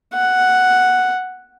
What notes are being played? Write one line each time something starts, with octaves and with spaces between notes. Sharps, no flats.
F#5